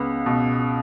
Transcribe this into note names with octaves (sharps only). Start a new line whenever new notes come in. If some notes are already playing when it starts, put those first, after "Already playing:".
Already playing: C#2 B3
B2